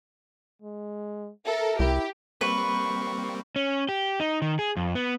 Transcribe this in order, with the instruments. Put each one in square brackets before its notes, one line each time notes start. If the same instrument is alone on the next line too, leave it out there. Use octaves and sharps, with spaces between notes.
[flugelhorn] G#3
[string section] A4 A#4 [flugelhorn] E5
[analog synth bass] C2 [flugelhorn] E4 [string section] G4
[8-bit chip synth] G3 A#3 C4 [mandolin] B4 [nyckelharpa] C#6
[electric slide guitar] C#4
G4
D#4
D#3
G#4
F2
B3